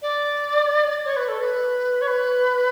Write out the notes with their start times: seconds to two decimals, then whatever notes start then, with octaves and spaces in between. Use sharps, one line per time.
0.02 D5
1.04 C#5
1.16 B4
1.28 A4
1.40 B4
2.01 C#5
2.07 B4